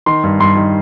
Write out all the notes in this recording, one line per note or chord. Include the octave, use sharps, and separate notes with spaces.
D#3 C6
G2
G2 C6
D#3